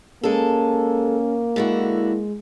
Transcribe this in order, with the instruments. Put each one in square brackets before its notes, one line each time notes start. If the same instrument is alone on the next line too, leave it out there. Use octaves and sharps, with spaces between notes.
[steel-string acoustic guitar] G#3 A4 [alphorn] A#3 [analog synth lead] C#4
[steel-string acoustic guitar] D3 E4 F#4 [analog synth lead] G#3